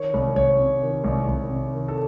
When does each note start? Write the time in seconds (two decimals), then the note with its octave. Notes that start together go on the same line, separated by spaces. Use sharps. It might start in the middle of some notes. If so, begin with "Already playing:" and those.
Already playing: D#3 C#5
0.14 C2
0.36 C2 C#5
0.59 C3
0.81 D#3
1.04 C2
1.28 C2
1.50 C3
1.73 D#3
1.88 A4